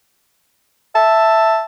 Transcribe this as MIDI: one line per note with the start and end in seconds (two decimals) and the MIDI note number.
0.95 1.63 76
0.95 1.63 81